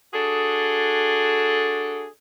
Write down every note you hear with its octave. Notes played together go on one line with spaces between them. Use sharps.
D4 F#4 G#4 A4